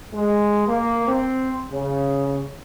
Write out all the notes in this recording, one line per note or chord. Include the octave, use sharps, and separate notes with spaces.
G#3
A#3
C4
C#3